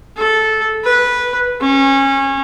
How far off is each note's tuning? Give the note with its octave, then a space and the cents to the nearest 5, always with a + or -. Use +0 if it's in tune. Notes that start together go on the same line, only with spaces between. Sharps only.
A4 -10
B4 -10
C#4 -25